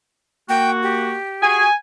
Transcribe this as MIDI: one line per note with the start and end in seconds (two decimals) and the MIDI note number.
0.49 1.14 58
0.49 1.14 66
0.49 0.70 79
0.83 1.69 67
1.42 1.65 66
1.42 1.65 68
1.42 1.73 80